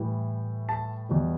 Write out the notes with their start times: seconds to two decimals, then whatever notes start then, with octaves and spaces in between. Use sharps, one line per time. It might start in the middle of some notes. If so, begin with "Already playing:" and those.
Already playing: A2 E3 G3
0.69 A5
1.09 E2 B2 G3